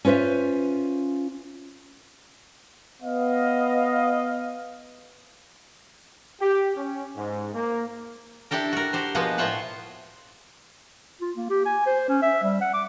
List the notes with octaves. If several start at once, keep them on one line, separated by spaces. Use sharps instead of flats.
C#4 F4 B4 C5 E5
B3 D#5 F5
G4
C#4
G#2
A#3
D4 E4 G4 A4 A#4
F#4 A#4
F#4 G4 C5
B2 F3 G#3 A#3 B3
A2 F4 C5 C#5 E5 F#5
F4
A#3
G4
G#5
C5
C#4
E5
G3
F#5
D6